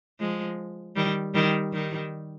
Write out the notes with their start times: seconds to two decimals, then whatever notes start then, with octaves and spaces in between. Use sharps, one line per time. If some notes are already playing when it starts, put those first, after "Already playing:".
0.20 F3 G#3
0.96 D#3 G3
1.34 D#3 G3
1.72 D#3 G3